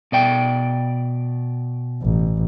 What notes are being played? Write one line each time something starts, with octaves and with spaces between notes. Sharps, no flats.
B2 D5 G5
A1